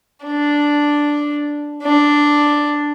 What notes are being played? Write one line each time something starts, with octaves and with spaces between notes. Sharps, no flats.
D4
D4